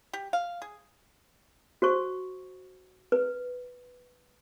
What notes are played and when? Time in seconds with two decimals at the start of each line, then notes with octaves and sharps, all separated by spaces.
0.13 G4
0.33 F5
0.62 G#4
1.82 F#4 C5 C#6
3.12 B4